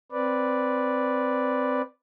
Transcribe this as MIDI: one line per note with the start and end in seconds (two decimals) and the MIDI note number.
0.12 1.82 60
0.12 1.82 71
0.12 1.82 74